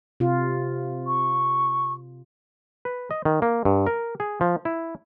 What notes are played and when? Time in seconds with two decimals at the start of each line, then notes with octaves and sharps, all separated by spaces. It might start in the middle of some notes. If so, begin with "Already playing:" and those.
0.20 C3 F4
1.07 C#6
2.85 B4
3.11 D#5
3.25 D#3
3.42 A#3
3.65 G2
3.87 A#4
4.20 G#4
4.41 F3
4.65 E4